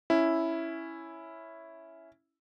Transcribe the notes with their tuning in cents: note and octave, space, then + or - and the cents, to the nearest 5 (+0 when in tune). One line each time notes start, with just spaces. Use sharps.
C#4 +0 E4 +0